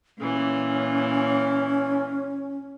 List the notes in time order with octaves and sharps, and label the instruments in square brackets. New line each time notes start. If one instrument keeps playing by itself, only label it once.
[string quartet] A#2 E3 [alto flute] C#4